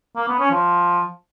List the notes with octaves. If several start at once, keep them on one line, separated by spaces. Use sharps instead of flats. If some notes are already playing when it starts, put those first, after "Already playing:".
A#3
B3
C#4
F3